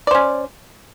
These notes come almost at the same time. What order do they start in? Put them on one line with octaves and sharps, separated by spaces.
D5 C5 C#4